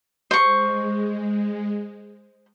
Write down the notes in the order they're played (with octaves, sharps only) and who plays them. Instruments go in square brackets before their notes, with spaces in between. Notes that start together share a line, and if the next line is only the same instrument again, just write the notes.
[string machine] G#3 [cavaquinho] C5 C#6